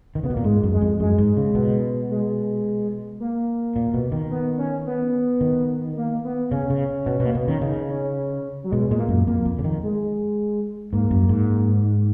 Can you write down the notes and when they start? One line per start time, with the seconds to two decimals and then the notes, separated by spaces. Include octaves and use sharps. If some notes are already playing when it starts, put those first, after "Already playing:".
0.15 D#3
0.23 C#3 B3
0.30 B2
0.34 A#2 A#3
0.44 G#2 G#3
0.63 F#2
0.72 G#3
0.81 F2
1.00 F#2 G#3
1.18 G#2
1.37 C#3
1.55 B2
2.10 G#3
3.20 A#3
3.76 A#2
3.94 B2
4.12 D#3
4.31 B3
4.58 C#4
4.86 B3
5.41 D#3
5.97 A#3
6.24 B3
6.51 C#3 C#4
6.70 C#3
7.06 B2
7.20 B2
7.25 A#3
7.35 B2 B3
7.48 D#3 C#4
7.61 C#3 D#4
7.90 C#4
8.64 F#3
8.72 B2 G#3
8.90 A#2 G#3
9.00 A#3
9.09 F#2
9.27 F2 A#3
9.45 F2
9.59 C#3
9.64 D#3
9.83 G#3
10.92 G#2 A#3
11.11 F#2
11.29 G#2